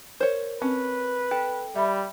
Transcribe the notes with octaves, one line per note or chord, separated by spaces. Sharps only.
A#4 C5 C#5
C4 C#4 B4
A4 G5
G3 E5 B5